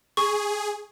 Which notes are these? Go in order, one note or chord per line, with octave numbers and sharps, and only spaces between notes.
G#4 C#6